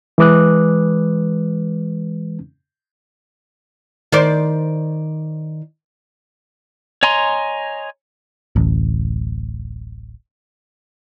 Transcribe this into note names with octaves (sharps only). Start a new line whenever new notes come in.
E3 G#3 B4 D6 D#6 F#6
D#3 C5 D5
C#5 D#5 G#5 A#5 C6
D1 A1